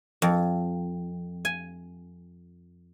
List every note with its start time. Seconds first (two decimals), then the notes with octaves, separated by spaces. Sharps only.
0.22 F2
1.45 G#5